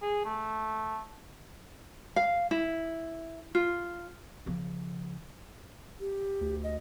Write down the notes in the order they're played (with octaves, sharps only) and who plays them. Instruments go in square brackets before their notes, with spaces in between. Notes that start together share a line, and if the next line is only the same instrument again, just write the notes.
[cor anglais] G#4
A3
[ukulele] F5
E4
F4
[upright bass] C#3 F3
[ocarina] G4
[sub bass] D2
[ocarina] D#5